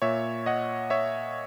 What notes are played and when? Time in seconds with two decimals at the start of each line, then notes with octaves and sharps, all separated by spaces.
0.02 A#2 C#5 E5
0.46 D#5 F#5
0.90 C#5 E5